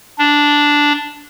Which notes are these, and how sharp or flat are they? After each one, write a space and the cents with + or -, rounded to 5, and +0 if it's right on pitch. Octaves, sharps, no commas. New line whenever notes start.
D4 -5